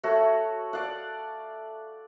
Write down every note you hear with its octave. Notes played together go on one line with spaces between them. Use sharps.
A3 F#4 C#5
D5 F5 F#5